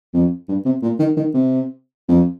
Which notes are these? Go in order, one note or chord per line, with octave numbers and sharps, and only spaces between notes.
F2
G2
C3
A#2
D#3
D#3
C3
F2